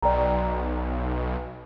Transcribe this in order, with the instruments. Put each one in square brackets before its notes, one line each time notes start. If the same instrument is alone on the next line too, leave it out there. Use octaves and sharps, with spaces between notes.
[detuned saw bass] B1 [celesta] D5 G5 A#5